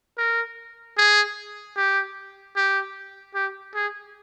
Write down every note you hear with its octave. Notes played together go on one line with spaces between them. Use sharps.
A#4
G#4
G4
G4
G4
G#4